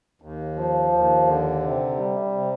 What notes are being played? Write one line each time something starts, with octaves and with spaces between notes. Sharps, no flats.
D#2
F3
D#2
D3
C3
G3
C3